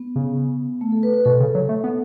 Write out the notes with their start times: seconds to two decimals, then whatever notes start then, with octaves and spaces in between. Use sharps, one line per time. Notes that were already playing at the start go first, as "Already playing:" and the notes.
Already playing: B3
0.16 C#3
0.81 A3
0.92 A4
1.03 B4
1.14 B4
1.25 B2 A4
1.40 C#3
1.55 F#3
1.69 A3
1.84 B3